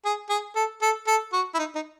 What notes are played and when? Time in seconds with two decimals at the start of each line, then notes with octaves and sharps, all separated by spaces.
0.05 G#4
0.30 G#4
0.56 A4
0.82 A4
1.07 A4
1.33 F#4
1.54 E4
1.59 D#4
1.75 D#4